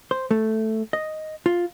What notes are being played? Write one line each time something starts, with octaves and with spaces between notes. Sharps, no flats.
C5
A3
D#5
F4